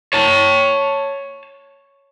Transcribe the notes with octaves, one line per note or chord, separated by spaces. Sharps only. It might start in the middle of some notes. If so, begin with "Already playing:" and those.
C#5 A5